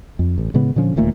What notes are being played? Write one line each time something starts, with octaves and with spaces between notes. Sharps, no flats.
F2
A1
A2 C#3 G#3 B3
A#2 D3 F3 C#4
D1 D#2 A#2 A3